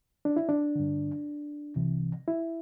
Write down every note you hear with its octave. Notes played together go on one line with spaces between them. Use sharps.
D4
E4
D4
G2 D3
C2 C3 E3
E4